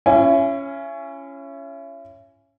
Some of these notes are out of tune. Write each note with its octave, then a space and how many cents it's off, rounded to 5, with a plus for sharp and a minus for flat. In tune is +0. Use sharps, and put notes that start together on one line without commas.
C#4 +0 E4 +40 G#5 +0